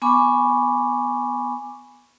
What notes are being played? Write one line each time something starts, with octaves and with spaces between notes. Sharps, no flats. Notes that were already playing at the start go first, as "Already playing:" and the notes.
B3 G#5 B5 C#6 D6